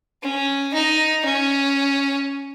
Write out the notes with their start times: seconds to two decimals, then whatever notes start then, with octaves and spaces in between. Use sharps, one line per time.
0.23 C#4
0.74 D#4
1.25 C#4